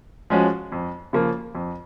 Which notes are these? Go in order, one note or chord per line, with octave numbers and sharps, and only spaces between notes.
F3 G#3 C#4 F#4
F2
C#3 F3 A#3
F2